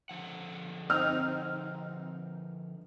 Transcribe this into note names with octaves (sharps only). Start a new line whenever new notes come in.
D3 F3 F#5
C4 D#4 F6